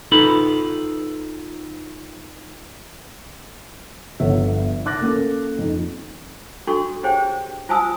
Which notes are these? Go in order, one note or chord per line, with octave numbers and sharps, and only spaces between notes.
D#4 F4 A4 B4 B5
G1 F3 B3 A4 C#5 E5
D6 F#6 A6 A#6
A#3 C#4 A4
F2 D#4
D4 F#4 A4 C6 C#6
G4 G#4 C5 C#5 G5
F4 C5 G#5 A5 D#6 E6